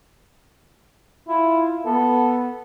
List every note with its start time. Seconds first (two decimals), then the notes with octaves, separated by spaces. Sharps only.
1.29 E4 F4
1.85 B3 A4